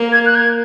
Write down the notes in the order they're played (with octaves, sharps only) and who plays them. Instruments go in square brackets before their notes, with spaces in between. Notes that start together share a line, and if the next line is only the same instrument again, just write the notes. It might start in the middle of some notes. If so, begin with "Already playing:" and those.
Already playing: [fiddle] A#3
[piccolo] G#6
F#6
G#6